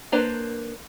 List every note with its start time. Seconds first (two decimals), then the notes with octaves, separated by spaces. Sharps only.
0.12 A#3 D4 B4 C5 A#5